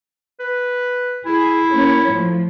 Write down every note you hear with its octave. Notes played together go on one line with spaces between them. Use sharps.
B4
E4 G#4
A#3 C#4 C#5
A2 F3